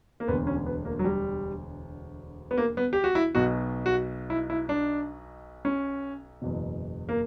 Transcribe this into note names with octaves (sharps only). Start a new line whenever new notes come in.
A#3
E1 D2 D3 B3
C#4
B3
A#3
F#3
G3
B3
A#3
B3
G4
F#4
E4
B1 B2 F#4
F#4
E4
E4
D4
C#4
F#1 E2 B2
A#3